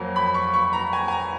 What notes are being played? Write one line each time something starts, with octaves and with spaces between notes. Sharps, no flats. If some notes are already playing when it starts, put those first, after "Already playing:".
Already playing: F2 F#3 A#3
B5
C#6
C#6
A#5
G#5
G#5
A#5